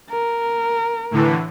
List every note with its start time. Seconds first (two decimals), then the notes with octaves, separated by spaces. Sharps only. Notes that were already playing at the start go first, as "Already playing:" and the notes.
0.10 A#4
1.11 A2 D3 E3